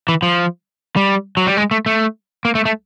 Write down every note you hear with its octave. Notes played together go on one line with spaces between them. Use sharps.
E3
F3
G3
F#3
G3
G#3
A3
A3
A#3
A3
A3